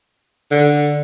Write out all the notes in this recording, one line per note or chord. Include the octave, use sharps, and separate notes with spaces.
D3